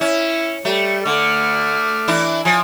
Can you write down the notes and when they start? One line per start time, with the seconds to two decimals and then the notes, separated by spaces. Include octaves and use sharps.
0.01 C#4 E4
0.65 G3 A3
1.05 D3 A3 D6 F6
2.08 E3 D4 E4
2.45 F3 G#5